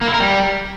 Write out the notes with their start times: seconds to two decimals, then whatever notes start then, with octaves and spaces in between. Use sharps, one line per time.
0.01 A#3
0.08 E4
0.14 A#4
0.20 G3